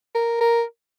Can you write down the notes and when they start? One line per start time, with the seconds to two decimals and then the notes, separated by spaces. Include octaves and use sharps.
0.15 A#4
0.40 A#4